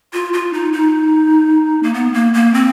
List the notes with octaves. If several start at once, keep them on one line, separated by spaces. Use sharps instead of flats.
F4
F4
D#4
D#4
A#3
B3
A#3
A#3
C4